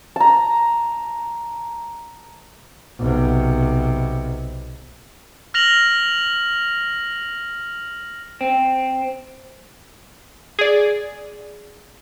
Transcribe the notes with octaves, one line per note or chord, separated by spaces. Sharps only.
A5 A#5
B1 C3
F6 A#6 F7 F#7
C4
G#4 D5